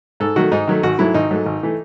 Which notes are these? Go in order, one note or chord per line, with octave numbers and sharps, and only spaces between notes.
G#2 A4
D#3 F#3 A3 F#4
G#2 D#4
D#3 F#3 A3
G#1 F#4
G#2 F#3 A3 E4
G#1 D#4
G#2 F#3 A3
G#1
E3 A3